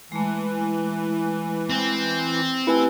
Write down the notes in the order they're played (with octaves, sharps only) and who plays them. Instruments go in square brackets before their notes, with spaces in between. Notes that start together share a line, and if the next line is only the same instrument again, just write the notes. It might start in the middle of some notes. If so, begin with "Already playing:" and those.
[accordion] E3 [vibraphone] G#3 A3
[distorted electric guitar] C4
[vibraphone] A3 G4 E6 [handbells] E4 B4 G#5